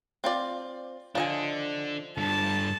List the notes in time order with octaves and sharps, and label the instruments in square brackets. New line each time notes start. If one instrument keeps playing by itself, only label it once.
[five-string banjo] C4 F4 D5
[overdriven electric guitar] D3 D4 [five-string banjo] F3 D#5 G#5
[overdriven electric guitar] G2 D3 [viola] A5